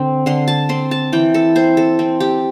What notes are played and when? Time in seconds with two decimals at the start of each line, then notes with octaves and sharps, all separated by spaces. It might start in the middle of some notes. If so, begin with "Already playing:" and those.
Already playing: D3 C4
0.26 D3 C6
0.48 A5
0.69 C4 C6
0.91 A5
1.13 E3 G5
1.34 A4
1.55 C4 C5
1.77 A4
1.99 C4
2.20 G4